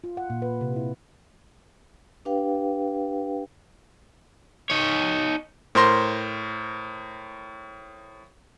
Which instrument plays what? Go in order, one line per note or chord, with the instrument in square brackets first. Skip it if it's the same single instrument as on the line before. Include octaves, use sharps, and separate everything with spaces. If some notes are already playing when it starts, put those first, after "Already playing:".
[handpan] F4
F#5
A#2
B4
C3
E4
[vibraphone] D4 G4 B4 F5 G5
[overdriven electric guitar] D#4 C#5
[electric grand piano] A2 A#4 C5 C6 A#6